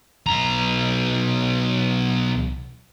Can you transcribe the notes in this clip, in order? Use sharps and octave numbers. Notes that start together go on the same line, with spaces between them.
B1 A#5